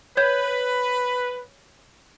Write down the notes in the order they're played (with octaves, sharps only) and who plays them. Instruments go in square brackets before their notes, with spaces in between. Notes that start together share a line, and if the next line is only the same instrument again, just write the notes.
[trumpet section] B4 [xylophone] C#5 G6